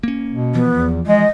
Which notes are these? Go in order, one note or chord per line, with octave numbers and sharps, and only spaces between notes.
A#3 C#4
B2
E3 F3 B3
E2
G#3 D#5